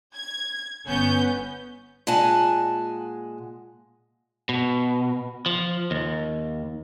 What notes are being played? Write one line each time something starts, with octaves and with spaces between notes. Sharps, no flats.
G#6
G1 B3 C#4 G6
A#2 G#3 F#5 G#5 A5
B2
F3
D#2